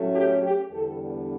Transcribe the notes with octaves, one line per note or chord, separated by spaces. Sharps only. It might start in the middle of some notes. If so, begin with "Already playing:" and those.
Already playing: A2 F#3 A3 C#4
G4
G4
E2 D3 G3 B3 D4 A4